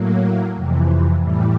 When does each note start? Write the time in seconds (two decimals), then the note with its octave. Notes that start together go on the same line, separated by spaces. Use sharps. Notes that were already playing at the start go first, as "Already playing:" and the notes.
Already playing: A2 F#3 A#3
0.55 F2 C3 E3
1.21 A2 E3 G3